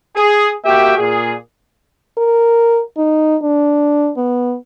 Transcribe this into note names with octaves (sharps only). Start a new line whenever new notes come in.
G#4
A#3 F#4 G4 E5 G5
A#2 G#4
A#4
D#4
D4
B3